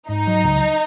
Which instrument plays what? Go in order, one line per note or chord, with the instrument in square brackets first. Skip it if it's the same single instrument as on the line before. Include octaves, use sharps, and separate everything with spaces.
[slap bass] G#2 [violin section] D#4
[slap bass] F#3
C#2